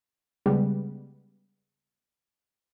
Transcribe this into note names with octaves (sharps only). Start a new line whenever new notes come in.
C#3 G3 G#3 B3